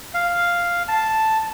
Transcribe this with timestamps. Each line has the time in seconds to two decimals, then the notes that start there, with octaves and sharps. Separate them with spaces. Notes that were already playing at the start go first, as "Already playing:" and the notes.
0.14 F5
0.88 A5